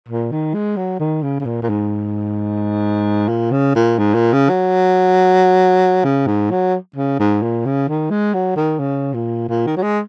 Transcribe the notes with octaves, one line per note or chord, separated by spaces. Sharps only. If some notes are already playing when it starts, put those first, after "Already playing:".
A#2
D#3
G#3
F#3
D#3
C#3
C#3
A#2
A#2
G#2
A#2
C#3
A#2
G#2
A#2
C#3
F#3
C#3
G#2
F#3
C#3
G#2
A#2
C#3
D#3
G#3
F#3
D#3
C#3
A#2
A#2
D#3
F#3
G#3